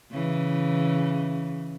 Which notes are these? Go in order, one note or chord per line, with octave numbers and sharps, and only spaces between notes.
C#3 E3